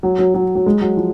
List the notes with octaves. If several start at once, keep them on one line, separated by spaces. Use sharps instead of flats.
F#3
F#3
F#3
F#3
G#3
F#3
F3